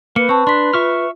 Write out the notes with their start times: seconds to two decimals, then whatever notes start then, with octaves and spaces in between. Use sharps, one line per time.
0.16 A#3 B4 C#7
0.29 C4 A5 C#6
0.47 D4 C6 B6
0.74 F4 E5 C#6 F6